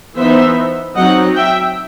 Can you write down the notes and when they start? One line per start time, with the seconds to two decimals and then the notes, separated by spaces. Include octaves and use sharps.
0.16 E3 B3 D#4 C5 E5
0.95 F#3 C4 D#4 D#5 F#5
1.36 E5 G5